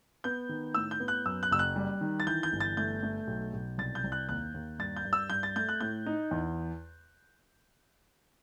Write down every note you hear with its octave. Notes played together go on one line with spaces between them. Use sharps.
B3 G6
D#3
A2 E6
G6
B3
F#6
F#2 E6
F#6
F#1 E6
F#6
G3
D#3
A6
E3 G6
G6
G1
A6
A3 G6
A3
B1
B1
C2 A6
G6
C2
F#6
D#2 F#6
D#2
G2 A6
G6
G2
E6
G2 G6
A6
A3 G6
F#6
A2 G6
D#4
E2